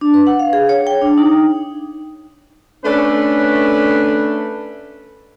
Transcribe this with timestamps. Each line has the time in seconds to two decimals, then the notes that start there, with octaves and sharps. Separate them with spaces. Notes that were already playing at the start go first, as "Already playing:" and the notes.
0.01 D4
0.14 B4
0.27 F#5
0.39 F5
0.53 G#4
0.69 C#5
0.87 G5
1.01 D4
1.18 D#4
2.84 A3 C#4 D4 A4 B4